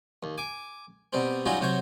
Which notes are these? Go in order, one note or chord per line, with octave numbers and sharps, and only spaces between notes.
D#2
G#5 D6
B2 G3 C4
F#3 G3 C#4 D#4 F4 F#4
C3 F#3 C5 C#5